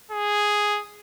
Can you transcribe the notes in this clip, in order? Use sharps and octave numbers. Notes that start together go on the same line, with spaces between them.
G#4